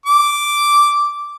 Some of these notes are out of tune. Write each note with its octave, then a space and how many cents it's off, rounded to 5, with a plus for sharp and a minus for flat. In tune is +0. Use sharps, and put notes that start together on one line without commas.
D6 -5